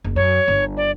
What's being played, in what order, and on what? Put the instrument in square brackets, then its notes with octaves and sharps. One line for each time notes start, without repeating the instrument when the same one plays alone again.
[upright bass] F#1
[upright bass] F#2 [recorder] C#5
[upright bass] G1
[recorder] D5